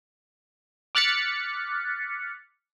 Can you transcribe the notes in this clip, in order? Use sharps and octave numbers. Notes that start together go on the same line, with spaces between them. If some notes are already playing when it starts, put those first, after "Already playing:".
D6 F6 F#6 A6 B6 C#7